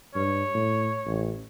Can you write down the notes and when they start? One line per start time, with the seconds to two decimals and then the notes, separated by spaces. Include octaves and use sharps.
0.15 G2 C#5
0.54 A2
1.06 A1